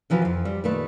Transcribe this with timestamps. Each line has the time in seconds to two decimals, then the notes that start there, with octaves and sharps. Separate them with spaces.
0.10 C3 E3 F3 F#4 B4
0.22 F2 C5
0.45 G3
0.64 A#2 D#3 A3 B4